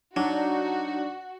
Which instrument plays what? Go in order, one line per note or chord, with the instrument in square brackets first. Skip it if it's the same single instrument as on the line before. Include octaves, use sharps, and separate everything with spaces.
[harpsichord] F#3 [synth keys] D4 [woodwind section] D#4 [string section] F#4